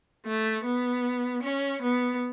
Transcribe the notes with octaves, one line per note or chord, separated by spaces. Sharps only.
A3
B3
C#4
B3